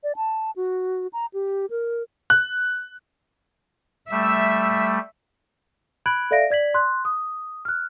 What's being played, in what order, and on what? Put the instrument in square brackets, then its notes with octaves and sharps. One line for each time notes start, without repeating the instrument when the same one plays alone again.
[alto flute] D5
A5
F#4
A#5
G4
A#4
[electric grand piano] F#6
[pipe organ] G3 A3 [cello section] E5
[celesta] B5 F#6 G#6 D7 F#7
A4 D5 E5 F5 A#6 D7
D5 G#6 B6 F#7
C6 F#6
D#6
F6 F#6